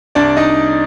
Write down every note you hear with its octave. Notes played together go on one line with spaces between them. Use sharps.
C2 D4 D5
D#4 D#5